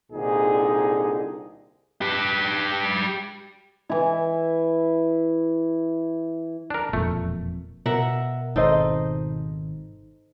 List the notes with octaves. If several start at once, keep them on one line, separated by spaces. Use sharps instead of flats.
C2 A#2 D3 D#4 G#4
G4 B4
E3 E4
D4 A#4
E1 F2 A#2 A3
B2 A#4 E5 F#5
G#1 D#4 A4 C5 D#5